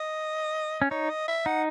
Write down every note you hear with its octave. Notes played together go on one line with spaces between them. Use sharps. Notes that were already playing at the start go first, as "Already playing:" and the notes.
Already playing: D#5
C#4
D#4 C#5
D#5
E5
D#4 F#5